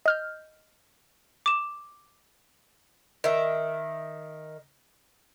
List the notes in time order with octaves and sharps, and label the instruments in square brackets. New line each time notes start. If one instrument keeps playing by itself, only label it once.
[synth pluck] D#5 F6 G6
[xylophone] D6 E7
[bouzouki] D#3 E5